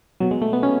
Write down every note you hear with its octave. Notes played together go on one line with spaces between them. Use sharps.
B2 F#3
G#3
A3
B3
B2 C#4